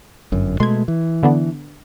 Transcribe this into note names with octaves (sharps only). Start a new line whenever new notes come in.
G1 F#2
B2 G#3 A3 C6 G#6
E3
D3 B3 D4